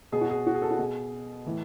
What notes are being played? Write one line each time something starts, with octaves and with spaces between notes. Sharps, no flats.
B2 G#4
F#4
G#4
F#4
G#4
A4
F#4
B2 G#4
A2 E3